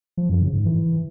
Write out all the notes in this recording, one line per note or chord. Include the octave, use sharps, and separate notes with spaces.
F3
F#2
C#3
G#2
E3